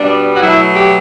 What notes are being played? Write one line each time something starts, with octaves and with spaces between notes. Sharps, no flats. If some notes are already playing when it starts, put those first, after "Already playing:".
Already playing: B2 G3 B3 D4
F#4
B2 F#3 A3 E4
G4